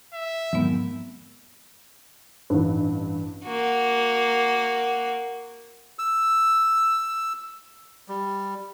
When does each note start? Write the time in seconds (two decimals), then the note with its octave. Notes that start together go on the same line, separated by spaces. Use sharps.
0.13 E5
0.53 F2 G#2 D#3 F#3 B3
2.50 A1 G2
3.45 A#3 F#4
5.99 E6
8.08 G3